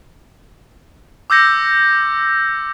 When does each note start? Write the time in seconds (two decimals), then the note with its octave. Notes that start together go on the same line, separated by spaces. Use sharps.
1.30 D6 E6 G6 A#6 C#7